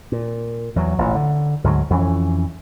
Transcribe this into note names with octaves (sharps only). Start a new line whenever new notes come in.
A#2
E2 F#3
A1 A#2
D3
D2 G#2 D3 F#3
F2 E3 C#4